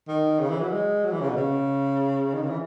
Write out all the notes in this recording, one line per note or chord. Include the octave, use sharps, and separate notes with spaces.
D#3
C#3
E3
F#3
G#3
F#3
E3
C#3
B2
C#3
D#3
C#3
E3